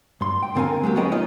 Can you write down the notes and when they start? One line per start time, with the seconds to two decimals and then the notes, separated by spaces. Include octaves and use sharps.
0.21 G2 C6
0.43 G5
0.55 C#2 D3 C4 A#4 F5 G#5
0.83 F#3 G#3 A#3 G4
0.95 D#2 B3 C#4 G#4 D#5 G5
1.12 A3 D#4 F4 C#5 D#5